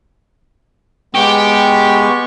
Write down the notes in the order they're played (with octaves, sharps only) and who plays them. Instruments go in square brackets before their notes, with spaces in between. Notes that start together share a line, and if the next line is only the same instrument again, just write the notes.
[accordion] G#3 B3 C#6 [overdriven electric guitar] G4